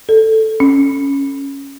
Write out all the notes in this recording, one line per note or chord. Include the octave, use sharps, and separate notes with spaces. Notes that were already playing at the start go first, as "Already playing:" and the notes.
A4
C#4